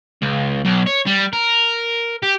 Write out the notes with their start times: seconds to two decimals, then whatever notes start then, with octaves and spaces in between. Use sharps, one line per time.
0.22 C#2
0.65 B1
0.86 C#5
1.06 G3
1.33 A#4
2.23 G4